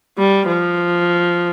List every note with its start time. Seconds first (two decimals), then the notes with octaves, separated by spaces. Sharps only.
0.18 G3
0.47 F3